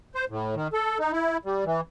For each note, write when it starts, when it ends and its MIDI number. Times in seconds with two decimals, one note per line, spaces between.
0.15 0.25 72
0.29 0.55 45
0.55 0.68 51
0.73 0.98 69
1.00 1.12 63
1.12 1.37 64
1.45 1.64 55
1.65 1.81 52